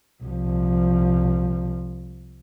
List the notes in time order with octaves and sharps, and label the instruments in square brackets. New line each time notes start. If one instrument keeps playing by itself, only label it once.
[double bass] C2 F3